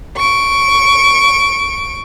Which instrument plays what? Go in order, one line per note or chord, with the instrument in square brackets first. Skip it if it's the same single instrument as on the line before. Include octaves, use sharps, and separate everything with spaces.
[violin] C#6 D7